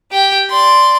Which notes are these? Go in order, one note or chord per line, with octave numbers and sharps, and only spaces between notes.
G4 G5
D5 C6